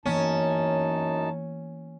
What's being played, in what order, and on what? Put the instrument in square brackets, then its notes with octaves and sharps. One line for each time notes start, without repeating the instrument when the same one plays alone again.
[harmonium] F#2 D#4 A5 [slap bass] E3 A#3 B3 [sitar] C#4